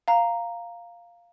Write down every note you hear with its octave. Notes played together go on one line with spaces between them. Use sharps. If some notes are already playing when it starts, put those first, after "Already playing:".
F5 A#5